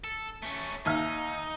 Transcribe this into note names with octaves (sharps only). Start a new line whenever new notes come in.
A4
A3 C#4
D#2 D#4 E5 F6